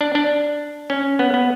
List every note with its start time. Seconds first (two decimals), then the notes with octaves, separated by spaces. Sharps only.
0.01 D4
0.15 D4
0.90 C#4
1.19 B3
1.34 B3